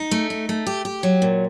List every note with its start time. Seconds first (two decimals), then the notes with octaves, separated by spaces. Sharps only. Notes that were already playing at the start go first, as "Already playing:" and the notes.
Already playing: D#4
0.11 A3
0.30 D#4
0.49 A3
0.67 G4
0.85 G4
1.03 F#3
1.22 A#2